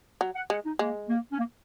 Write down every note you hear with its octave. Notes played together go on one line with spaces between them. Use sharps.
F#3
F#5
G#3 F#5
D#4
G#3 A#3
A#3
C#4
A#3